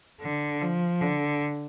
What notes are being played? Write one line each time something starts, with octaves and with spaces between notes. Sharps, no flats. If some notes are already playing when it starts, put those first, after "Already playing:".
D3
F3
D3